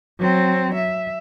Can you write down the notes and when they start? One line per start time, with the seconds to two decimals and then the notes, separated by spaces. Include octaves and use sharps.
0.20 F#3 C4
0.75 E5